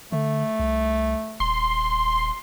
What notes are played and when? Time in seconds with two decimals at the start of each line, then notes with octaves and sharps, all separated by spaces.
0.12 D3 A3
0.60 C2
1.40 D#1 C6